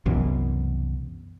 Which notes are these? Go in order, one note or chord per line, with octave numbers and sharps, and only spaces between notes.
C2 F#2 B2 E3